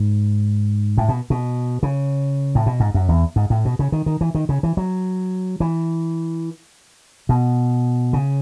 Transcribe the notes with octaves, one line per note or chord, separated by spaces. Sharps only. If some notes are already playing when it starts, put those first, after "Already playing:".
Already playing: G#2
A2
B2
B2
C#3
A2
B2
G#2
F#2
E2
G#2
A2
B2
C#3
D#3
D#3
E3
D#3
C#3
E3
F#3
E3
B2
C#3